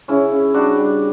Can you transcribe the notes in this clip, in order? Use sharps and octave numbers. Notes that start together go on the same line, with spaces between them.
C#3 C#4 E4
C#3
G3 D4 F#4
G3